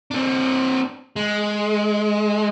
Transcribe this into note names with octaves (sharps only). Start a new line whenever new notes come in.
C4 D4
G#3